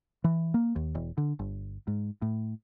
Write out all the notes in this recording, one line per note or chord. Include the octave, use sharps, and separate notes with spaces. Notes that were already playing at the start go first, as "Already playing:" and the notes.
E3
A#3
D#2
E1
D3
G1
G#2
A2